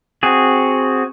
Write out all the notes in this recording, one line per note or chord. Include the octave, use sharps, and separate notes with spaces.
C4 F#4 G#4